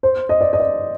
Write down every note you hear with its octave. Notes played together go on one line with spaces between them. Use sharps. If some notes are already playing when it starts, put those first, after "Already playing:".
C5
D#5
D5
D#5
D5